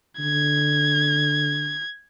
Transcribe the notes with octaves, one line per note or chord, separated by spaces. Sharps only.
D3 G#6